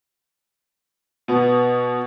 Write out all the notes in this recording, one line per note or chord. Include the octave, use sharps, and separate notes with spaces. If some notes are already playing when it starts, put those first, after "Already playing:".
B2 B3